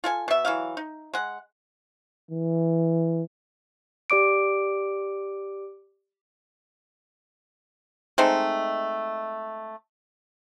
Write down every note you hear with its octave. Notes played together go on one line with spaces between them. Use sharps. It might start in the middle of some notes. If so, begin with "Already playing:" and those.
F4 A4 G#5
B2 E5
E3 F#3 F5
D#4
G#3 F#5
E3
G4 D5 D6 D7
G#3 A3 C4 D#4